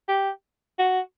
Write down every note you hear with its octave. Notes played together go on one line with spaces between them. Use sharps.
G4
F#4